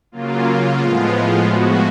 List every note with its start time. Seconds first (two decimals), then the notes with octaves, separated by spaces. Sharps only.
0.12 C#3 F#3 A#3 F4
0.79 A2 F3 G#3 B3
1.47 A2 F3 G#3 B3 F#4